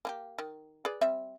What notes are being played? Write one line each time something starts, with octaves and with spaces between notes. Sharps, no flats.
A#3 F4 G4
D#3
G#4 B4 D5
G3 C4 E5